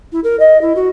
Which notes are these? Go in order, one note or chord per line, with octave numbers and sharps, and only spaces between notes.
E4
A#4
D#5
E4
F#4